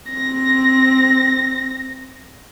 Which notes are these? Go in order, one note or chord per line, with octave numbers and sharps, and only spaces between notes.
C4 A#6